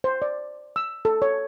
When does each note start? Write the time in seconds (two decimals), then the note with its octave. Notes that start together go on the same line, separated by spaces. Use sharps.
0.04 C5
0.22 D5
0.76 E6
1.05 A4
1.22 C#5